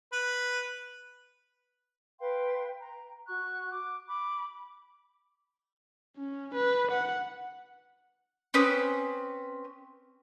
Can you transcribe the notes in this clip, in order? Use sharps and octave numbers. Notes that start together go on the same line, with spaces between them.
B4
B4 F5 G5 C6
A#5
F#4 C#6 F#6
D6
B5 D6
C#4
B4
F#5
C4 C#4 B4 D#6